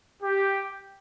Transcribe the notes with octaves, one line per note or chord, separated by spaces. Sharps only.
G4